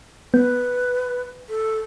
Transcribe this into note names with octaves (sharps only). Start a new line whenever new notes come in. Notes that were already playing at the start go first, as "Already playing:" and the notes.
B3 B4
A4